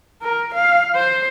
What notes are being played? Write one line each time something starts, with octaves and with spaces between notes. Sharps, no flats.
A#4
F5
C5